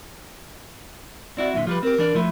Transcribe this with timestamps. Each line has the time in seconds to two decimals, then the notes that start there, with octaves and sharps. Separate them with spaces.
1.37 C4 E4 F#4 D5
1.54 F#2 A#2 D3 E5
1.67 F3 G3 G4 B4
1.83 C4 G4 A#4
1.98 E3 D4 D5
2.15 F3 A3 E4